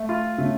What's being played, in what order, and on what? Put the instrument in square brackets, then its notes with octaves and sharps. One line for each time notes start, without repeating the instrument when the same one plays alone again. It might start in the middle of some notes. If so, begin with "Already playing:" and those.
Already playing: [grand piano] A3
F4
[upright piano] C#3 [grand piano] A3